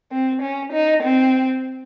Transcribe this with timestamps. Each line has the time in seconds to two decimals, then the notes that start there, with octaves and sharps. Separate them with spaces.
0.12 C4
0.42 C#4
0.72 D#4
1.03 C4